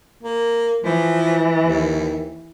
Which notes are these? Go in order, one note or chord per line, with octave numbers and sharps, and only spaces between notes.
A#3
E3 F3
D#2